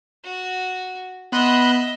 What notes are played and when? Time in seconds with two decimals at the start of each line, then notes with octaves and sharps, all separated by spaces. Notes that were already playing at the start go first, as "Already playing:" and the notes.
0.24 F#4
1.32 B3 D#5 E5 B5 C6 F#6